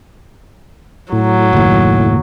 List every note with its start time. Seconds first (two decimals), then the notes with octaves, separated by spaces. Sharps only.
1.13 A2 F#3
1.53 F#1 D#2